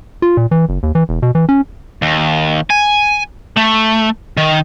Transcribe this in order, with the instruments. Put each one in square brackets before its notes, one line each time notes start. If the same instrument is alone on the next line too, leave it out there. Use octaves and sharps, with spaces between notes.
[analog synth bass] F4
A#2
E3
F#1
D#2
E3
E1
B2
E3
C#4
[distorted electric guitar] D#2
G#5
A3
D#3